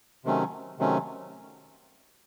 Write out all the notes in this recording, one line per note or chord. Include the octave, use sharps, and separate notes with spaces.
C3 D#3 F#3 A3 C#4
C3 D#3 F#3 A3 C#4